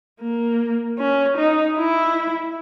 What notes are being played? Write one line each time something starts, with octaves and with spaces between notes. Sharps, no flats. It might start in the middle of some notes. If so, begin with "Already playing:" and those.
A#3
C#4
D#4
E4